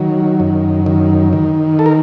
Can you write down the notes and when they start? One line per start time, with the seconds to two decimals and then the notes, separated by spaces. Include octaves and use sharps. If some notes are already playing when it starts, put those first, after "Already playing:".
Already playing: D#3 F#3
0.40 F#2
0.86 D#3
1.33 D#3
1.79 A4
1.86 A#4